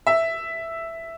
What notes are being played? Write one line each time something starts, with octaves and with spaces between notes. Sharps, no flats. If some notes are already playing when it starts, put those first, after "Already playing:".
E5